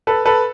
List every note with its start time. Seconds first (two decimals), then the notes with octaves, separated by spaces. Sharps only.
0.07 A4 B4
0.25 A4 B4